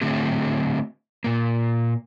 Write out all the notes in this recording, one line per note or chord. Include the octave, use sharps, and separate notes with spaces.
D3 F#3 A3 C4 G#4
A#2 A#3